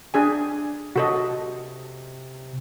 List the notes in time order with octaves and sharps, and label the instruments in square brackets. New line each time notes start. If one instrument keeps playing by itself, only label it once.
[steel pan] D4 G#4 G#5
[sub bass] C3 [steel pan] F#4 A4 D#5